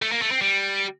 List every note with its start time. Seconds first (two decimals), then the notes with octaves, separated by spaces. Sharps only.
0.02 A3
0.12 A#3
0.22 A3
0.31 C4
0.41 G3